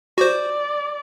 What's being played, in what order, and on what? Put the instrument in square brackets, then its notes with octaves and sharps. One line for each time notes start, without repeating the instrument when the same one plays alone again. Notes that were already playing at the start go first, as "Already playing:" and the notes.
[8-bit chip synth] F#4 C5 [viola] D5